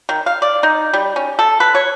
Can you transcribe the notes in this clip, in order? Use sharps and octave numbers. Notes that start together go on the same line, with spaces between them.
D#3
F5
D5
D#4
G3
C#4
A4
B4
C#5